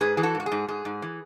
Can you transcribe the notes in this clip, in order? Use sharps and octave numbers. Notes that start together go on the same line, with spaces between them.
G#2 G#4 B4
E3 G#4
F#4 A4
G#2
F#4
G#4
G#2
G#2 G#4
G#2
E3